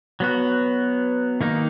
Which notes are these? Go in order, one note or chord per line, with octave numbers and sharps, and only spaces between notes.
F#3 B3 F#4
D#3 A#3 D#4